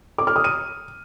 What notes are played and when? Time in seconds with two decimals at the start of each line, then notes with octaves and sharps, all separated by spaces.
0.18 D6
0.27 F6
0.36 D#6
0.44 D#7